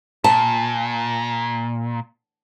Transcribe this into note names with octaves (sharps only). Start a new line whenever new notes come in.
A#2 A5